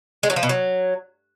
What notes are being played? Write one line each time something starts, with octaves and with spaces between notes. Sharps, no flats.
G#3
F#3
F3
B2
F#3